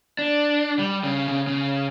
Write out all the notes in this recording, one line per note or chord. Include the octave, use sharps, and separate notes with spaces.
D4
G3
C#3
C#3
C#3